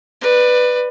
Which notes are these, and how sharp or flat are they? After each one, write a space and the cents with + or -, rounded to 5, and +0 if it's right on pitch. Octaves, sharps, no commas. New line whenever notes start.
B4 +0 D5 +25